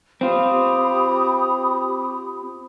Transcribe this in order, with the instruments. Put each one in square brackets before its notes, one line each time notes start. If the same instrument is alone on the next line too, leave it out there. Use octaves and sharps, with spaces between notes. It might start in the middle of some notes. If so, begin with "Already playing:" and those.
[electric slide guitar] C4 F4 [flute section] G4 B5 D#6